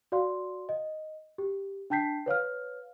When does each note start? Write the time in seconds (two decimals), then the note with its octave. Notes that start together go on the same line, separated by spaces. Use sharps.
0.12 F#4 D5 F5 C6
0.69 D#5
1.38 G4
1.90 D4 G5 A5 G6 B6 C7
2.26 B4 C#5 F5 F6